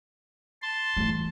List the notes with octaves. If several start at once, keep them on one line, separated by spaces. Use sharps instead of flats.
A5 C6
E3 A3